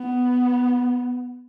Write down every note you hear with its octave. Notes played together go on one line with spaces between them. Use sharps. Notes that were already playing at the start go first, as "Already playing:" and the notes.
Already playing: B3